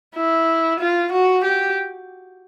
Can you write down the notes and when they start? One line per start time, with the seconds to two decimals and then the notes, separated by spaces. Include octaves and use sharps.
0.15 E4
0.79 F4
1.11 F#4
1.44 G4